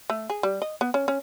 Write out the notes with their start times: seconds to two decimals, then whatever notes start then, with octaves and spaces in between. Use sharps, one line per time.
0.10 A3
0.30 G#4
0.43 G3
0.62 D#5
0.81 B3
0.94 C#4
1.08 C#4